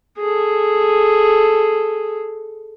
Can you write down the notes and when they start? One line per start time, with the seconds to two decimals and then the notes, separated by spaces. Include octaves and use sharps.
0.19 G#4 A4